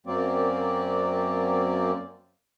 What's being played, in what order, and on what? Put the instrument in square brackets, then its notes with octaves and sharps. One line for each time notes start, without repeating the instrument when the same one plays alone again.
[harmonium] F#2 F#3 A#3 C4 D5